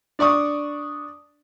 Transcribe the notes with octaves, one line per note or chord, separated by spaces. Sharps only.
D4 D5 C#6 D#6